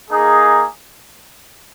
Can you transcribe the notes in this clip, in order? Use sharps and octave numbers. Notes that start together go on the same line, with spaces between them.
A#3 D#4 G#4